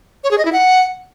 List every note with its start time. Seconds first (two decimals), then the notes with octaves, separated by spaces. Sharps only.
0.24 C#5
0.31 G#4
0.38 D#5
0.45 E4
0.52 F#5